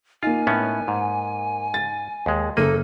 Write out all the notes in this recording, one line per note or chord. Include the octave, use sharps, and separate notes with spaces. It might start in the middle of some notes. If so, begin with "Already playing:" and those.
A#3 D#4 F4 G#5
A2 B3 C#4
G#2
A6
D#2 G#3
F#1 A#3 A4 D#7